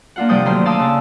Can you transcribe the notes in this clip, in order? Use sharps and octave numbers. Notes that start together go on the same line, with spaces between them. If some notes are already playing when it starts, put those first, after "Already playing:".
A#3 D4 F4 F#5
G2 C3 F3 G3 G5 D#6
D2 D#3 F#3 A#5 C6
D5 F5 A5 C6 D#6 E6
C#3 D4 A#5